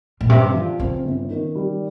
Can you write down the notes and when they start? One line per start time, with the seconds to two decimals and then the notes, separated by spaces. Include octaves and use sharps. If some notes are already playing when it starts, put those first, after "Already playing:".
0.21 A#2
0.29 G2 C3
0.54 F3
0.79 C#3 C4
1.05 G1
1.30 D#3
1.55 G3